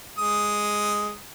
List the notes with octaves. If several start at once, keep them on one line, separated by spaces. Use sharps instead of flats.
G#3 D#6